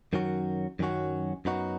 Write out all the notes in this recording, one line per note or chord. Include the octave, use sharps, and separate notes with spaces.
F#2 D#3 F#3 C#4 F#4
F#2 D#3 F#3 C#4 F#4
F#2 F#3 B3 D#4 F#4